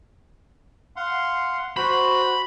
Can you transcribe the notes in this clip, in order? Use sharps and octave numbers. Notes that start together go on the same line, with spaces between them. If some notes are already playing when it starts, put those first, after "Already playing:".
F5 F#5 C6
F#4 C5 B5